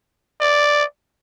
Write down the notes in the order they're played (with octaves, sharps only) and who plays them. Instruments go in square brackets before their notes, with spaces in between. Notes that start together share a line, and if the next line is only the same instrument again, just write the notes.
[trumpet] D5